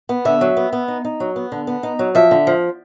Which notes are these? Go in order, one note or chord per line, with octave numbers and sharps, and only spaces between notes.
B3
D3 E5
F#3
B3
B3
D#4
D#4
F#3
B3
D3
B3
D#4
F#3
F3 E5
D3
F3